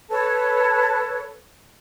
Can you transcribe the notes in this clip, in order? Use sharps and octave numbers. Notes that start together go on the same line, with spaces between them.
A4 B4 C#5 A5